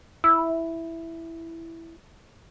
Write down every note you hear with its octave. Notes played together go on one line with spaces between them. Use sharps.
E4 E6